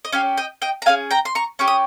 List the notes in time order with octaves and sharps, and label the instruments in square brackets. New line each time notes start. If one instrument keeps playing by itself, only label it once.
[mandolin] D#5
C#4 G4 C#5 F5
D#5 G5
D#5 G5
A#5
C#4 F4 G#4 F5 G#5
G5 A#5
C6
A#5 C#6
C#4 G4 C#6
D#6